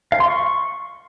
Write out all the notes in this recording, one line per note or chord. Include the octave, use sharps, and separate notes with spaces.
F5
C6
C#6